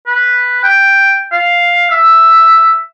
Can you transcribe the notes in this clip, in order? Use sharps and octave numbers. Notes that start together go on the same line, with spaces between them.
B4
G5
F5
E5